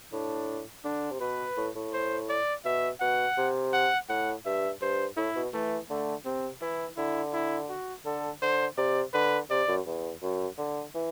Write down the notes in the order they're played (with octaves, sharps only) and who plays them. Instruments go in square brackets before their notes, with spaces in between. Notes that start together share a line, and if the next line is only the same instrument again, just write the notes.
[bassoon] A2 [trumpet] D4
[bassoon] D3 [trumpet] D4
[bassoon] C3
[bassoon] B2 [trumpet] B4
[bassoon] A2
A2
[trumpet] C5
D5
[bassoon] B2 [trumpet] E5
[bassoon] B2 [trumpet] F#5
[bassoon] C3
[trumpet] F#5
[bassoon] A2 [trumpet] F#5
[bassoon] G2 [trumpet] E5
[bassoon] G2 [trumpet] C5
[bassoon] A2 [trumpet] E4
[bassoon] B2
[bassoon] E3 [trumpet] A3
[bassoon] D3 [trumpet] A3
[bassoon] C3 [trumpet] C4
[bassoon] E3 [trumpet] E4
[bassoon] D3 [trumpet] E4
[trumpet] E4
F#4
[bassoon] D3 [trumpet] A4
[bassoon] D3 [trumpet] C5
[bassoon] C3 [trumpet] D5
[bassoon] D3 [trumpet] B4
[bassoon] C3 [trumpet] D5
[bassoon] F#2
E2
F#2
D3
E3